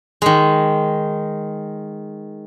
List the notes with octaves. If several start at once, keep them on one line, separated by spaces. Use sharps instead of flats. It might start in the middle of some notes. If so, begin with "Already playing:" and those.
D#3 G#3